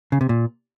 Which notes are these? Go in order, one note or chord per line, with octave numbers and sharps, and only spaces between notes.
C#3
C3
A#2